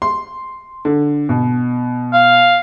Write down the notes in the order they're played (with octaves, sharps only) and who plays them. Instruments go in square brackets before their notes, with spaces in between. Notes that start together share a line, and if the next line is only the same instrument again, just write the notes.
[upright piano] C6
D3
B2
[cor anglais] F5